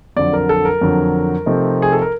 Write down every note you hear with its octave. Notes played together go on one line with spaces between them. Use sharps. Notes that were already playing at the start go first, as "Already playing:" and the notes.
F2 D3 F#3 D5
A#4
A4
A#4
F2 D3 F#3
C3 F3 A3 C4 D#4
G#4
A4
A#4